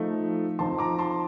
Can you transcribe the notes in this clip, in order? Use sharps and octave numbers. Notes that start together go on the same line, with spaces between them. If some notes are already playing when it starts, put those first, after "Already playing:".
Already playing: F3 A3 D#4
F3 C4 D#4 A5 C6
A#5 D6
A5 C6